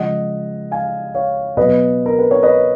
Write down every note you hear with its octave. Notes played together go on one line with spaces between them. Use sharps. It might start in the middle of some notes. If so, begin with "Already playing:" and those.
Already playing: C#3 F3 G#3 D#5 F#5
F5 G#5
C#5 F5
B2 F#3 B4 D#5
A#4
B4
C#5
B4 D#5